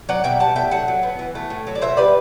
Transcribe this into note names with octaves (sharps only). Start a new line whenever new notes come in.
F#3 D5 F#5
B2 E5 G5
G3 F#5 A5
A2 E5 G5
F#3 F#5 A5
F#3
B3
E3
A3
A2
F#3
D5
B2 C5 E5
G3 B4 D5